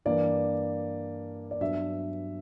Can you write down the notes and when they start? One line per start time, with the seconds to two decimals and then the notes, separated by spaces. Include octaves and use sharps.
0.05 G2 E3 A#3 D5
1.51 D5
1.61 G2 F#3 B3 E5